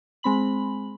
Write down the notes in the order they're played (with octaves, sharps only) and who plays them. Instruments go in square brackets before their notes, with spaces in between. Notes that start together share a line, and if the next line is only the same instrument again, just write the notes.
[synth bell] G#3 C4 B5 F#7